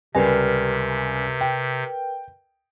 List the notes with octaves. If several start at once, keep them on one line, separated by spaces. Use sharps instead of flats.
C#2 C3 G3 A#4 B4 D#5 G#5
G5